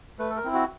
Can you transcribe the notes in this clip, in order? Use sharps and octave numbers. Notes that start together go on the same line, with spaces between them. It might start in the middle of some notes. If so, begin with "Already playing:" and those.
A3 B4
A4
A#4
C4 E4
F#4